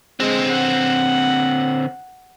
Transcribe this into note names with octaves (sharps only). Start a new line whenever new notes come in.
D3 G#3 C4
F#5